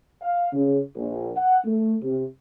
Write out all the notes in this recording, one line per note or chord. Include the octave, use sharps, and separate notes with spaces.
F5
C#3
A#1
F#5
A3
C3